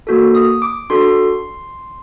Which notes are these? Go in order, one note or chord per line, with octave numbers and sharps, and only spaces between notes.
A#3 F#4 A4
D#6
D6
D4 F#4 A4 C6